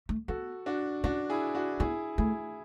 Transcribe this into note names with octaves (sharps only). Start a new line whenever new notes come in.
A3
B3 F#4 A4
D4 F#4
C#4 D4 F#4
E4 G#4
D4 F#4
B3 E4 G#4
A3 E4 G#4